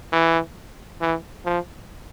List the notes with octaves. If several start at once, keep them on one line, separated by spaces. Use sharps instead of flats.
E3
E3
F3